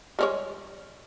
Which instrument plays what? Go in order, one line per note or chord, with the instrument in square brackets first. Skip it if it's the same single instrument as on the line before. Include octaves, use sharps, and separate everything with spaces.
[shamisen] G3 G#3 C#5